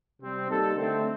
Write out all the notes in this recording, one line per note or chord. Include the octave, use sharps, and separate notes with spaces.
C3 G3 C4
G3 A#3 D#4 A4
D3 A3 C4